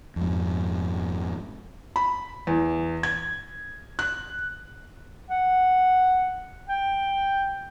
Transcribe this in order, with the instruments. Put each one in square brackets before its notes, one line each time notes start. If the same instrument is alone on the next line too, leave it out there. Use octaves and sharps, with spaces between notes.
[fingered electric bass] F2 G#2
[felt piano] B5
E2
G#6
F#6
[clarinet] F#5
G5